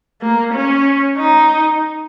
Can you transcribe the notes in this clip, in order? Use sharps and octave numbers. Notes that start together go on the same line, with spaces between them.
A#3
C#4
D#4